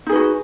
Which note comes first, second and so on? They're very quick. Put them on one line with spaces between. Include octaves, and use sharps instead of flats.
D#4 G#4 B4 F#4